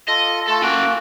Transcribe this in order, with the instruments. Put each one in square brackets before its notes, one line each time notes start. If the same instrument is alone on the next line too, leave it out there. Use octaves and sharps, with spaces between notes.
[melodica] F4 A4 [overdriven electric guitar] D#5
[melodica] A3 F4 [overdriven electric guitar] A4
[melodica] A#3 F#4 [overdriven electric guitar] C#4 G5